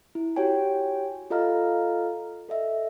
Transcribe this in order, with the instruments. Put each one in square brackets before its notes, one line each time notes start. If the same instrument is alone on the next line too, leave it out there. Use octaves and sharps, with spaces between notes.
[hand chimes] E4
F#4 G4 C#5 G5 G#5
F4 A4 D#5 F5 A#5 F6
A4 D#5 E5